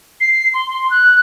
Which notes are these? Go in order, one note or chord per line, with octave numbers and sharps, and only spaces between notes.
C7
C6
C6
F#6